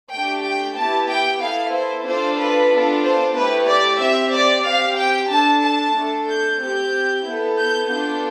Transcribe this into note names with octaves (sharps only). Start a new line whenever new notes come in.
A3 D4 G4 G5
G5
B3 E4 G4 A5
G5
B3 E4 A4 F5
C5
D4 F4 A4 C5
B4
B3 D4 F4 A4
C5
A3 E4 G4 B4
D5
C4 G4 E5
D5
C4 G4 F5
G5
D4 A4 A5
A5
A3 D4 A4
G6
C4 G4 G6
B3 E4 A4
G6
B3 D4 F4 A4 G6